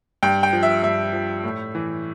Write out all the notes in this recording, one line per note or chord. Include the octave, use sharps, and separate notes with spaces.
G2 G5
G5
F3
E5
G2 E5
F3
A2
E3